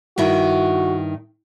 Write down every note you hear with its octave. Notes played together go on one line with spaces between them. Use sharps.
G2 D#3 E4 F#4